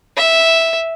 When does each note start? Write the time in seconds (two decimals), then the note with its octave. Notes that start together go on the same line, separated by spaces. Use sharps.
0.17 E5